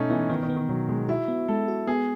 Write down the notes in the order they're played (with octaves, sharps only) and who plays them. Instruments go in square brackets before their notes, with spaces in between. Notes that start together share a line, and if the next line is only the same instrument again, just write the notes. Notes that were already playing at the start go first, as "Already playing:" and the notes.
Already playing: [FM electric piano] B2 G#3 [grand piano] A3 C#4 D#4
[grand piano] E3 [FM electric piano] B3
[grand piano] D#3 [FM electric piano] B3
[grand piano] D#3
[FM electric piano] B3
[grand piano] D#3
[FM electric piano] B2 [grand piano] F#3
[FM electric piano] B2 [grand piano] G#3
[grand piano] E4 [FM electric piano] F#4
[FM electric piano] B3
[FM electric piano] G#3 [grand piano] A4
[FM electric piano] F#4
[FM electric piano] B3 [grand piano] G#4